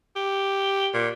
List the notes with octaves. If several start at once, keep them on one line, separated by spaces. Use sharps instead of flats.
G4
A#2